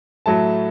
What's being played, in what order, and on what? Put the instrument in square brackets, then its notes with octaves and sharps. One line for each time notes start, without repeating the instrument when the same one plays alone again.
[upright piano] A2 F#3 A3 A5